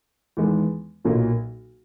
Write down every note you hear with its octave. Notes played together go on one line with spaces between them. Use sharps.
E2 D#3 G#3 B3
B1 A#2 F#3 A#3